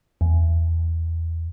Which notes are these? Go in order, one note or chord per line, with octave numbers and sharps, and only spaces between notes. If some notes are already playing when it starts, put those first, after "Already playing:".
E2